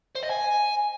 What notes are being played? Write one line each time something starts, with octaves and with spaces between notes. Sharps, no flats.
C5
D#5
G#5